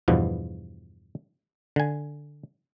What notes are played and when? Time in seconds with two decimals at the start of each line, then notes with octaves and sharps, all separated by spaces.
0.08 E2 G2 B2 F3 B3
1.76 D3 G#5